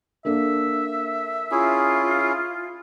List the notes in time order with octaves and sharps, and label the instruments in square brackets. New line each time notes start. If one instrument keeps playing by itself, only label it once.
[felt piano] A#3 D4 A4 [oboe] E5
[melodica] C#4 E4 G#4 [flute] F4